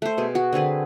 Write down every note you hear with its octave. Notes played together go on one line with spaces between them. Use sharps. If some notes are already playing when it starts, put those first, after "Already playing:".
A3 C5
B2 G#4
F#4
D3 C4 G#4 B4